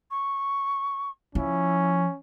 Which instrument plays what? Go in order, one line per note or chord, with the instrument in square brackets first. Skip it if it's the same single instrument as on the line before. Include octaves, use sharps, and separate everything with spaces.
[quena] C#6
[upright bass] F3 [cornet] C#4 [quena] E4